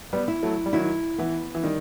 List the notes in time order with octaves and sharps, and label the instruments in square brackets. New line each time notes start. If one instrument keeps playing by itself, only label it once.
[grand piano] G3 B3
[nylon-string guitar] E4
[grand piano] F#3 A3
G3
[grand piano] D#3 F#3 [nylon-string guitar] E4
[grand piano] E3 [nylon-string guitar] B3
[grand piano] E3
[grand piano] D#3 [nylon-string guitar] G3